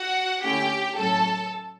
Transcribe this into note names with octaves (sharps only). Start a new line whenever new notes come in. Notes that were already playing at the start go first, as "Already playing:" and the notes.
Already playing: F#4 F#5
D3 A3 C#4 E4 G4 G5
A2 F#3 C#4 A4 A5